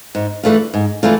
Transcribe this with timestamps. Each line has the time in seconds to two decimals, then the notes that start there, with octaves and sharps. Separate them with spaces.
0.15 G#2
0.43 E3 A3 D4 F4
0.74 G#2
1.03 E3 A3 D4 F4